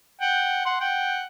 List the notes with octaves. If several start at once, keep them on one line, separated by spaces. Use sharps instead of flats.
F#5 G5
F#5 C6
F#5 G5